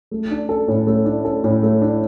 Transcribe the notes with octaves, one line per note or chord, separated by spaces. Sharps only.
A3
D4
A4
A2
A3
D4
A4
A2
A3
D4